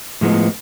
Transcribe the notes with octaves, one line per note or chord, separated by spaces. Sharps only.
A2 F3 G#3 B3